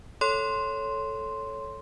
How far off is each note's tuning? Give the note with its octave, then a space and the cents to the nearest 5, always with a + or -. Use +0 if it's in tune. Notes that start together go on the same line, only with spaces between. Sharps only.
A4 +0 C#5 +0 C6 +0